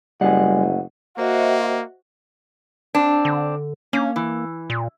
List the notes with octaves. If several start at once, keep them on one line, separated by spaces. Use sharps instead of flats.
F#1 D2 G3 D#5 F#5 G#5
A#3 F#4 C5 D#5 E5
C4 D4
D3
A#3 C#4
E3
A#2